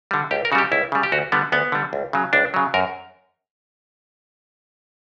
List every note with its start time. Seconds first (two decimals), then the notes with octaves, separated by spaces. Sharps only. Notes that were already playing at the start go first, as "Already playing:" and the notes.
0.11 D3 G3
0.31 C#2 G4
0.45 A#4
0.52 C#3 F#4
0.55 G3 G4
0.72 C#2 E4
0.92 C#3 G3
1.03 G4
1.12 D2 F#4
1.32 D3 G3 B3
1.52 D2 B3
1.72 D3 G3
1.93 C#2
2.13 C#3 F#3
2.33 C#2 D4
2.54 C#3 F#3
2.74 F#2 A#4